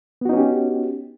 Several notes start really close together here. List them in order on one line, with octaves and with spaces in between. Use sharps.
B3 F#4 D#4 C#4 G4